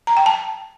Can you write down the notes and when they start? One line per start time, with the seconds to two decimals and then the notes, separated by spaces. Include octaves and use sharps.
0.07 A#5
0.17 G5
0.26 A5